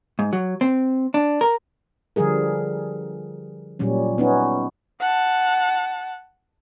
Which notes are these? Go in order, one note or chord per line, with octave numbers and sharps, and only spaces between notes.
G#2
F#3
C4
D4
A#4
D3 F3 G3 G#4 A#4
A#2 F#3 G3 C#4
B3 C#4 D#4
F#5 A5